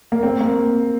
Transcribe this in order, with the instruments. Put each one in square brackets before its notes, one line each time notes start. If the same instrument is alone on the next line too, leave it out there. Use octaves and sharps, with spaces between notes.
[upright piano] A#3
C4
A#3